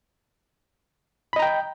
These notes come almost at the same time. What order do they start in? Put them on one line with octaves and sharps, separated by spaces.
B5 D#5 A#5 G5